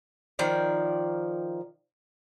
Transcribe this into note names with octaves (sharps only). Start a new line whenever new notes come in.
D#3 F3 D5